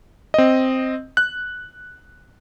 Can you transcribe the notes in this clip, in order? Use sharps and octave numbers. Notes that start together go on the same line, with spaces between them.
C4 D#5
F#6